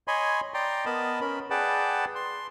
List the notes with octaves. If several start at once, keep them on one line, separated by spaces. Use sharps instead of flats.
C#5 D#5 G#5 B5 C6
D5 G5 A#5 C6
B3 A#4 D#5 A5 B5
C#4 A#4 B5
G#4 B4 D5 F#5 G5 A5
C6